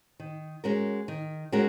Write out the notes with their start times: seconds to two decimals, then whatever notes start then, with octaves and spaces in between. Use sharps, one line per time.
0.20 D#3
0.64 G#3 C#4 F#4 A#4
1.08 D#3
1.52 G#3 C#4 F#4 A#4